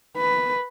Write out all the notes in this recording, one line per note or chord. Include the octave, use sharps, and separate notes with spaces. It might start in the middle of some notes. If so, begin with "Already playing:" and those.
B4